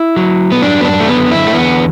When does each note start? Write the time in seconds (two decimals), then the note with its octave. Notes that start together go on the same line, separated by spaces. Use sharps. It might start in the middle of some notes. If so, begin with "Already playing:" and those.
Already playing: E4
0.16 F#3
0.52 B3
0.62 F#2 D4
0.81 B3
0.85 D4
1.00 A3
1.08 D3 B3
1.32 E4
1.47 A3
1.54 E2 B3